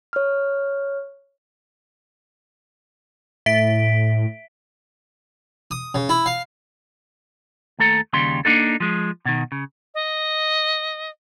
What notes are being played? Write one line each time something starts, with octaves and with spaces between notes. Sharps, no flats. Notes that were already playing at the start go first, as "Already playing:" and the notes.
C#5 F6
A2 E5 B6 D7
D#6
C#3
E4
F5
D#2 A3 A4 A#5
D#2 C#3 G3 C6
A#3 C4 D4 D#4 A4
F3 G#3
B2 D#3
C#3
D#5